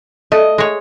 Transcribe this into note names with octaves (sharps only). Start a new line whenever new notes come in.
A3 D#5
G#3 C#5